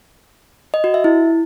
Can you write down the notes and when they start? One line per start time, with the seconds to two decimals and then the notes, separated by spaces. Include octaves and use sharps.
0.74 D#5
0.84 F#4
0.94 E5
1.04 E4